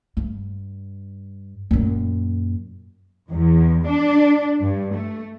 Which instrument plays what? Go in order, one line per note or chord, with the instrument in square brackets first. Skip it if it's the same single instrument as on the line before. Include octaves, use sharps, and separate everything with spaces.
[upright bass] G2
F#2 A#2
[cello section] E2
D4
G2
A3